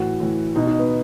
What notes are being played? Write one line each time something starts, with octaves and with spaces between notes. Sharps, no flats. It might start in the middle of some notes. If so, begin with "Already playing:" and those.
Already playing: A2 E3 F#4
A2 E3
B2 D#4
D#4
B3